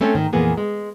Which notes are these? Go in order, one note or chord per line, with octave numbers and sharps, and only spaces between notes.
A3 C4 C#4 A4
G#2 D#3
F2 A#2 E3 A#3 B3 G#4
G#3